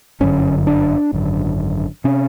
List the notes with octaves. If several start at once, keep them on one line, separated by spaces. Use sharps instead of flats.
G1 F#2 D3 C#4
D4
G#1 F#2 D3
C3 C#4